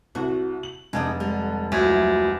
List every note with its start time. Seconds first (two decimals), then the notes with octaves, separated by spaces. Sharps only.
0.15 C2 F#4
0.63 F#7
0.93 F1 G#3 D4 D#4
1.20 D3 G3 G#3
1.72 D2 F#3 E4 F4